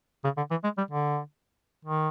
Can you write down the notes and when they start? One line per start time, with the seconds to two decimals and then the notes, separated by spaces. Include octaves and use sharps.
0.24 C#3
0.37 D3
0.51 E3
0.64 G#3
0.77 G3
0.91 D3
1.85 D#3